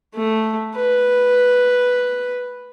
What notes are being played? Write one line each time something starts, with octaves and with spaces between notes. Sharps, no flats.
A3
B4